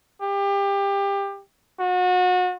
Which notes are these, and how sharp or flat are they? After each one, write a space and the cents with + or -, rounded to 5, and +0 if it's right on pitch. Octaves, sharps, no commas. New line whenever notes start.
G4 +25
F#4 -30